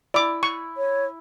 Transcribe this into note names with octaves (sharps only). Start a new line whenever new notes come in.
E4 D5 D6
C#6
C#5